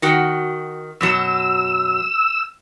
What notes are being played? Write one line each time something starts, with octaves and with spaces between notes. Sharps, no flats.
D#3 F#4 G5
F#2 B2 F#3 E6